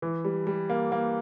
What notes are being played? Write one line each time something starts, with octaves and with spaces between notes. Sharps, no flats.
E3
G3
G3
A#3
A#3